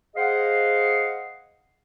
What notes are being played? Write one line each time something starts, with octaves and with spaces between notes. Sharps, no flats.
G#4 C5 D#5 F5 F#5